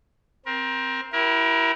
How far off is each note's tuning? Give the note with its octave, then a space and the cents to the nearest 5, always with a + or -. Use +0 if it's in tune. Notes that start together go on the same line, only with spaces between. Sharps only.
C4 +0 A#4 +25
E4 +0 G4 -40 A#4 +30